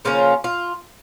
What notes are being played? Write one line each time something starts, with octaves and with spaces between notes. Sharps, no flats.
C#3 F3 A#3 C#4 F4
F4